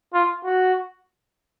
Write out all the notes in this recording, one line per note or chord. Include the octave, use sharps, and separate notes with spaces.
F4
F#4